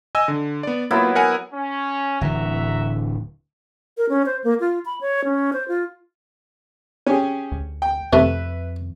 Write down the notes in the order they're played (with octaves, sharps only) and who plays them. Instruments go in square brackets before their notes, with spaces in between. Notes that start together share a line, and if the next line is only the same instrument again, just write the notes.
[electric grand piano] D#5 G#5 E6
D3
B3 D5
[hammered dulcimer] F#3 B3 E4 [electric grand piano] A#3 F4
[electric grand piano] A#4 F#5 G#5
[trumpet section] C#4
[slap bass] D1 D3 E3 [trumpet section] F#4 E5 A#5
[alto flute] A#4
C#4
C5
A#3
F4
B5
C#5
C#4
C5
F4
[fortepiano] C#4 G4 G#4
[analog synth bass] D2
[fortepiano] G5
[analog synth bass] F2 [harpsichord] C3 A3 [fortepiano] B4 E5